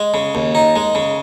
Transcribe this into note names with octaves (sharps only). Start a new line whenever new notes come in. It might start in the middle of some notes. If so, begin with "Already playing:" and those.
Already playing: G#3
C#3
D#2
D#4
G#3
C#3